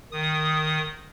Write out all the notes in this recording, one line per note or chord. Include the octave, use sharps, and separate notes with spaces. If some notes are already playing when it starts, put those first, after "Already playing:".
D#3 D#6